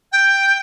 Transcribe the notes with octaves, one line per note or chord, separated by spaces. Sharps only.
G5